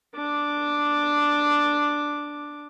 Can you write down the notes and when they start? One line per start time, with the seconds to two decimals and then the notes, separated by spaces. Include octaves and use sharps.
0.15 D4 D6